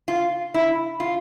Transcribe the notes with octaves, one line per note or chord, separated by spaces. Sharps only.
F4
E4
F4